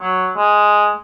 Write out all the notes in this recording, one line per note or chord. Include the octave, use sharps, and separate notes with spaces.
F#3
G#3